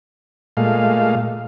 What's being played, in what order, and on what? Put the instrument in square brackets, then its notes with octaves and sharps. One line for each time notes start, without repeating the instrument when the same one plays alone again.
[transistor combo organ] A#2 G#3 A3 F5